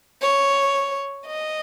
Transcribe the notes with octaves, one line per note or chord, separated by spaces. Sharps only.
C#5
D#5